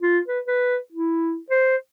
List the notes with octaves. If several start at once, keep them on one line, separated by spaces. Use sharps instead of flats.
F4
B4
B4
E4
C5